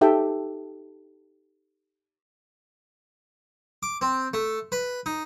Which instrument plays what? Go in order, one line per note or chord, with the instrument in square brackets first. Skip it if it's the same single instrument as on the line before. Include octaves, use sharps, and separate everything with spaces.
[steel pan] D#4 G4 A4 E5 G5
[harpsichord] D6
C4
A3
B4
D#4